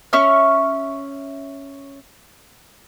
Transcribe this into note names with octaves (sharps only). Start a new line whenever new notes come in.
C#4 E5 C#6 F6